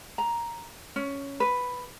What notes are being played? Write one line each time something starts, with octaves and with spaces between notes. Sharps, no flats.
A#5
C#4
B4